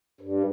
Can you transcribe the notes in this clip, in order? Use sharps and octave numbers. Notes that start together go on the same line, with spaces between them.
G2